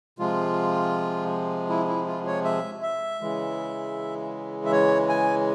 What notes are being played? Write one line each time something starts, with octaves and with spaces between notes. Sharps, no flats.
C3 F3 G#3 F4
E4
E4
F4
C#5
E5
E5
C#3 E3 G#3
E5
C#5
G#5